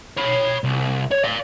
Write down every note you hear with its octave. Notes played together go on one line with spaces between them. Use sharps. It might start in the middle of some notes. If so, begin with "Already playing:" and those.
C#5 B5
C2
C#5
D5 F5